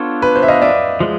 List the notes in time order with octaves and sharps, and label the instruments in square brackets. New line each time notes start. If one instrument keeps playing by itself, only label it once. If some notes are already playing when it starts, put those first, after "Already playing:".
Already playing: [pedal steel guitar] B3 D4 F4 A4 C#5
[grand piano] B4
C5
E5
D#5 F5
D5 E5
[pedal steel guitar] F3 G#3